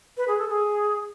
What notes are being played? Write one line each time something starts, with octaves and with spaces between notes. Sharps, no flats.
B4
G#4
A4
G#4